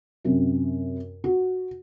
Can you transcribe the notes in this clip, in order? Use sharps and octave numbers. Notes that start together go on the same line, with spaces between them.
F#2 C3
F#4